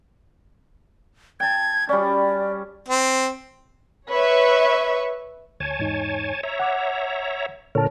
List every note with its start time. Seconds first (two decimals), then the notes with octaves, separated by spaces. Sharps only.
1.40 G5 A5 G#6
1.89 G3 C#4 D5
2.88 C4
4.09 B4 C#5 E5 C#6
5.60 D2 C#5 G#5 A5 G#6
5.79 E2 G#2 D#4
6.43 C#5 E5 A#5
6.59 F#5 D6
7.75 A#2 D3 A#4 C#5 A5